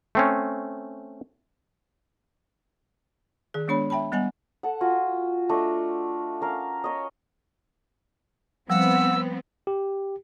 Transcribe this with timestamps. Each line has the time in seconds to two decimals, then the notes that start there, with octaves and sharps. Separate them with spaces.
0.15 A3 C4 C#4
3.54 D#3 G#4
3.67 D#3 G#3 B3 D4 C#5 B5
3.90 E5 G5 A5 B5
4.12 G3 B3 D#5 F#5 G#5
4.63 A4 F#5
4.81 F4 F#4 G#5
5.49 A3 D4 D#5
6.41 C#4 A#4 F5
6.84 A#4 C#5 D#5
8.70 F3 G3 B3 C4 F#5 E6
9.67 G4